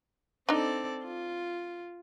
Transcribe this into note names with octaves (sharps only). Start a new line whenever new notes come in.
C4 D4 D#4 A4 D5
F4